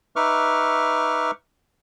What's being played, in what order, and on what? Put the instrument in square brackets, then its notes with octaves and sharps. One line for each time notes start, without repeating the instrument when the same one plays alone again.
[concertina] D#4 B4 E5 C#6 D6 F6